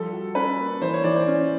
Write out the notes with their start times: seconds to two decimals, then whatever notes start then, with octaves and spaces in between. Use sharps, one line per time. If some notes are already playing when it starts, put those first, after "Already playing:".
Already playing: F3 G3 A4
0.13 F#4
0.35 C#4 B4
0.59 A#3
0.81 E3 C5
0.94 C#5
1.04 E3 D5
1.16 C5
1.27 C#4